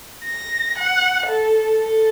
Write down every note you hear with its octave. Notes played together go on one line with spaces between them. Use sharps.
A#6
F#5
A4
A4